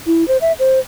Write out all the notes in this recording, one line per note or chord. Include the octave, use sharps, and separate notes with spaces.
E4
C5
E5
C5